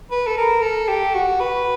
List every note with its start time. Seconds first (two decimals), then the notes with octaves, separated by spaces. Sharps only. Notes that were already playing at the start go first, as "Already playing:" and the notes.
0.11 B4
0.26 A4
0.37 A#4
0.62 A4
0.88 G4
1.15 F#4
1.40 B4